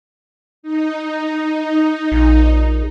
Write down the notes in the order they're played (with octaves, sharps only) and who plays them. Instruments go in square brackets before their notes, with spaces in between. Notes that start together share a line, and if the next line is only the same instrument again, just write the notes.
[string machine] D#4
[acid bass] A#1